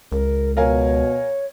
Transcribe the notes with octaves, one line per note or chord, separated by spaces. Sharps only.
C#2 A#4
B2 A#4 C#5 F5 G#5